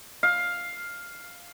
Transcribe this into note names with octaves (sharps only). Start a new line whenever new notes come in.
F5